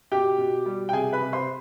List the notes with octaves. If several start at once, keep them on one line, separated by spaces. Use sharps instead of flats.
B2 G4 G5
B2
G3
G5
C3 G#4 G#5
B4 B5
C3
C5 C6